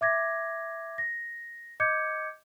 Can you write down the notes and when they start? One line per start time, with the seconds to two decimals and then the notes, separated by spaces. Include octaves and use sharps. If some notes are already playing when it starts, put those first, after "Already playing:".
0.01 E5 D6 G#6 A#6
0.98 A#6
1.80 D#5 D6 G6 G#6 C#7